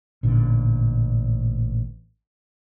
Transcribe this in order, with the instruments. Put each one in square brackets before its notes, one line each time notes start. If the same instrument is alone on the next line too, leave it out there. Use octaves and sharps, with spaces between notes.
[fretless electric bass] A1 A#2 D3